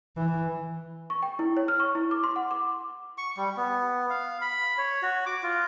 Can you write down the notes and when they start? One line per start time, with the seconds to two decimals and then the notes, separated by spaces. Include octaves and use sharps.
0.16 E3
1.10 C#6
1.22 G5
1.39 E4
1.57 C#5
1.68 F6
1.80 C#6
1.95 E4
2.11 D6
2.24 C6
2.36 F#5
2.51 D6
3.18 C#6
3.37 G3
3.57 B3
4.10 F5
4.41 B5
4.78 C#5
5.02 F#4
5.26 D6
5.43 F4